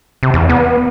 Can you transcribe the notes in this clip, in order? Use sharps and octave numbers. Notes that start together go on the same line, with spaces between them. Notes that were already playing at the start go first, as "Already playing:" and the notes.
C3
E2
B3